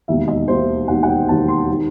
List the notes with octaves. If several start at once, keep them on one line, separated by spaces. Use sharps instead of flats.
E1 D#2 D#3 E5
D#5
E1 D#2 D#3 C5
E1 D#2 D#3 F#5
F#5
G5
E1 D#2 D#3 A5
C6
D#3